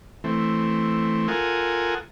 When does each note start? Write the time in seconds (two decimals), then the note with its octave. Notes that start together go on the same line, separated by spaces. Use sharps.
0.24 E3 A3 C4
1.28 F4 A4 A#4 F#5 G#5 D#6